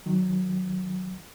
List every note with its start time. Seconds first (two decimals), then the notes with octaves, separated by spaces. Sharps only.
0.06 D#3 F#3